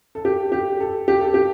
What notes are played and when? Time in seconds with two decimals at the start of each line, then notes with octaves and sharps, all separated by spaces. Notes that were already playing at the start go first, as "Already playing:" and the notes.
0.15 A4
0.25 G4
0.52 G4
0.80 A4
1.08 G4
1.21 A4
1.34 G4